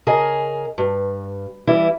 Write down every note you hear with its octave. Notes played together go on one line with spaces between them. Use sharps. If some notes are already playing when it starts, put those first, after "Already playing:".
C#3 G#4 A#4 D#5 G#5
G2
E3 G3 E4